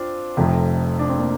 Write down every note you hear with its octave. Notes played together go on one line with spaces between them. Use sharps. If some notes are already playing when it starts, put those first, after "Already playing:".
Already playing: C4 D4 F4
F1 F2 C3
D4
C4
A#3 D4